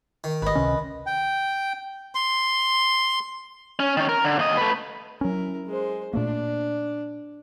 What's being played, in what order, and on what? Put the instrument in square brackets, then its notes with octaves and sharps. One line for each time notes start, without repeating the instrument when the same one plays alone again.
[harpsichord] D#3
[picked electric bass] G#1 [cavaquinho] B4 D#5
[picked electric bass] C#2 C3 C#4
[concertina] G5
[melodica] C6
[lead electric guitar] C#4
D#3 C#4
A#4
D3
D#2 D#5
A3 B4
[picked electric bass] F#3 C#4 [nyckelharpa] E4 A#4
[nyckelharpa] G#3 C5
[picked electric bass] A#2 A3 A#3 [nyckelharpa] D4